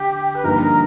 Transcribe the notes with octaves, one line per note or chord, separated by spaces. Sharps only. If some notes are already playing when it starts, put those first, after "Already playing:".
Already playing: D3 G4
B4
G2 D3 F3 A#3 D#4 A#4
A#4